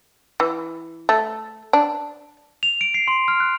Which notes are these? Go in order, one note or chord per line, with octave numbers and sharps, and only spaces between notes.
E3
A3
D4
F7
D7
C7
C6
F6
F#6